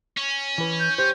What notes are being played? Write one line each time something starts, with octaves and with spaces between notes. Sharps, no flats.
C#4
E3 B4
G6
G4 C5 G6